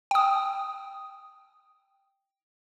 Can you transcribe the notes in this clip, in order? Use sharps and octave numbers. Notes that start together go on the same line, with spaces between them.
G5 D#6